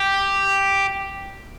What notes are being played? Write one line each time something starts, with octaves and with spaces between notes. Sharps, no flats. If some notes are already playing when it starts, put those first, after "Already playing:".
Already playing: G4